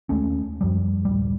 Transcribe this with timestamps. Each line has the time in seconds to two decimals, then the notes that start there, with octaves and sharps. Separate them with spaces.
0.09 D#2 G#3 A3 C#4
0.61 F#2 F3 G3
1.05 D1 G3